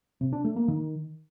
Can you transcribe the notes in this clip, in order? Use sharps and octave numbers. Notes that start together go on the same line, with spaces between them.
C3
D4
A3
A#3
D#3